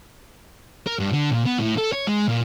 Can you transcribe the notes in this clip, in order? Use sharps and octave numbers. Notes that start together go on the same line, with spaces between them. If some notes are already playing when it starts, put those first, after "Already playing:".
A#4
G2
D3
A#2
B3
A2
A4
C#5
G#3
A#2